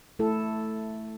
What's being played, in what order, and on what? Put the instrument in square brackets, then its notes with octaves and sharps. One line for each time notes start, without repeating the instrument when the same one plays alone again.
[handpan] A3 E4 A4